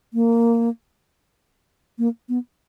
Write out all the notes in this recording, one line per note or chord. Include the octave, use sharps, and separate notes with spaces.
A#3
A#3
B3